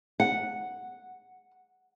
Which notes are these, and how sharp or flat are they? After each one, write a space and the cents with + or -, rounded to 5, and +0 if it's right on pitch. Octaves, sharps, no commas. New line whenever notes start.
F#5 -5